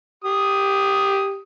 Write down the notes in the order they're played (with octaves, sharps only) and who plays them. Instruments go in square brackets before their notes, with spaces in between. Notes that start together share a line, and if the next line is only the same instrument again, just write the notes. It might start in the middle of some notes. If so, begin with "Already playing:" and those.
[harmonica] G4 D#6